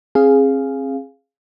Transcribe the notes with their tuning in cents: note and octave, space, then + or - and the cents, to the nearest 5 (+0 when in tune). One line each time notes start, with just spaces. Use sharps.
C4 +40 G#4 +0 F5 +0